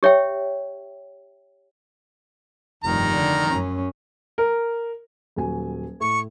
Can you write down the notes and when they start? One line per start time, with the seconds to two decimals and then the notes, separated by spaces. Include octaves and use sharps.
0.03 G4 C#5 E5 G5
2.84 F1 G2 D#3 A#5
3.12 D3
3.49 F#2 C#4
4.38 A#4
5.36 D#1 F#3 G#5
6.00 A2 C#6